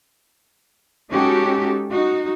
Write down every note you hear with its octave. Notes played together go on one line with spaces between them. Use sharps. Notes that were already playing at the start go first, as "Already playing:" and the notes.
G#3 C#4 D#4 F#4 G4 A4
D#4 F#4